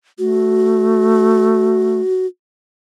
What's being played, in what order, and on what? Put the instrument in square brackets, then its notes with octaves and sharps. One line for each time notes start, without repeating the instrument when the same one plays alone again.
[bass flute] A3 [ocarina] F#4